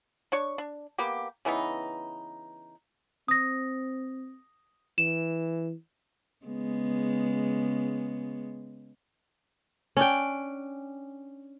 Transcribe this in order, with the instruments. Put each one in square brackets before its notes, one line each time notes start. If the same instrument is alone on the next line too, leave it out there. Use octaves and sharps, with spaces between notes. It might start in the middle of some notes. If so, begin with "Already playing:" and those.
[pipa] D4 C#5 C#6
D4
A#3 B3 G4
C#3 E3 B3 D#4
[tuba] C4 [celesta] D#6 A#6
[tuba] E3 [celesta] E7
[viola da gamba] C#3 G#3 B3
[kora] C#4 D4 G5